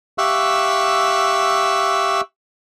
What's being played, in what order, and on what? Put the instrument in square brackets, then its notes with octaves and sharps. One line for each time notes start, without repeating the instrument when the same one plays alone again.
[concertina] G4 E5 F5 C#6 E6 F#6